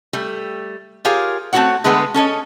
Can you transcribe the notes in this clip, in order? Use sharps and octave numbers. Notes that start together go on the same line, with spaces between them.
G3 A3
F4 G4 G#4 A#4 C#5 F5
A3 C4 E4 F#4 C#5 F#5
D3 G#3 A3 B3 G#4 B4
C#4 A4 C#5 D#5